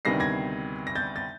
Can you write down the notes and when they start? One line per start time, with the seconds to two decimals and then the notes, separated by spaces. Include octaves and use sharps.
0.05 D2 C3 D#3 G3 B3 A#6 C7
0.20 G#6 A#6
0.87 A#6
0.95 G6 A6
1.16 A6